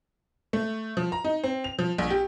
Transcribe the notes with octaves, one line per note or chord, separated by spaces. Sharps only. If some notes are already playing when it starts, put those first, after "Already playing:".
A3
F3
A#5
D#4
C4
F7
F3
A#1
G4